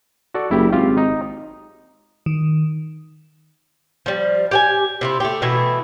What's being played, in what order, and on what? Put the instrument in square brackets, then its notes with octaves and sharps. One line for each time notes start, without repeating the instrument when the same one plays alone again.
[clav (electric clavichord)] F#4 A4 D5
[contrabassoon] F#1 [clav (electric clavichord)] E4 G4
[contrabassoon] G#1 [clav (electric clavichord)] F4 G4 F5
[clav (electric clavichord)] D#4
[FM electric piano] D#3
[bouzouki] F3 G3
G4 G5 G#5
C3 E4 F4
A3 G4
B2 E3 A3 E4